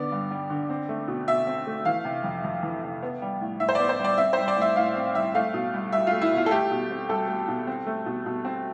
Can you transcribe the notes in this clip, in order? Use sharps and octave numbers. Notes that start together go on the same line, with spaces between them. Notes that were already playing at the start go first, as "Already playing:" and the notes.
Already playing: D3 B3 D5
G2
G3
D3
C4
A3
B2
B2 E5
C4
A3
E3 F5
C3
F2
F2
E3
C3
B3
G3
A2
A2 E5
C5
B3 D5
C5
G3 D5
C4 E5
G3 C5
D5
A2 E5
A2 F5
C4
G3 E5
A3 F5
B2
C2
C2 E5
F4
A3
E4
B2
F4
A4
A3 G4
B2
C4
C2 A4
A3
B2
C4
A3
B2
B2
C4